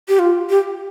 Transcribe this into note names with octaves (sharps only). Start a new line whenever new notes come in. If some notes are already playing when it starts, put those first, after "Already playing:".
G4
F4
G4